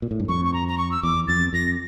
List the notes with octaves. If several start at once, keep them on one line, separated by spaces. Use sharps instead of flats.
A#2
A2
G2
F2 C#6
C#6
A#5
A#5
C#6
E6
E2 D6
F2 A6
F2 A#6